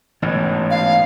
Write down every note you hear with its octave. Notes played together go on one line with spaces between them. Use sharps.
A1 G#2 B2
F5